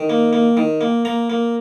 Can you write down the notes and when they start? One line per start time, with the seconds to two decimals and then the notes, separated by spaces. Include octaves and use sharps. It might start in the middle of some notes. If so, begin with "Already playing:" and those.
Already playing: D#3
0.10 A#3
0.33 A#3
0.57 D#3
0.81 A#3
1.05 A#3 A#5
1.30 A#3